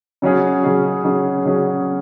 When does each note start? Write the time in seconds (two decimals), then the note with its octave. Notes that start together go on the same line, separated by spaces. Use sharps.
0.22 C#3 F#3 C#4 G#4
0.64 C#3 F#3 C#4 G#4
1.04 C#3 F#3 C#4 G#4
1.45 C#3 F#3 C#4 G#4